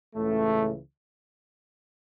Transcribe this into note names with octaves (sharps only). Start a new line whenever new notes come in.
C#2 A2 C#3 E3 A3